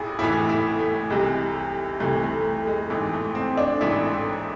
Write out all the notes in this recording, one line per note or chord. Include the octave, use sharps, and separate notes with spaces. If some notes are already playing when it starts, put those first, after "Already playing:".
Already playing: A1 A2 E3 G#4
A1 A2 E3 E4
E4
A3
C2 C3 E3 G#3
C2 C3 E3 A3
A3
G#3
A1 G#2 E3
A3
C4
D4
A1 G#2 E3 E4